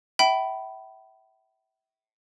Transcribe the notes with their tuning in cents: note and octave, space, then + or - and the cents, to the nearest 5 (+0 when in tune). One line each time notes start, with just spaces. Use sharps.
E5 -15 G5 -40 B5 +0